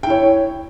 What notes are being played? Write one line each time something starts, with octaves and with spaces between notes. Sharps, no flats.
E4 C#5 G5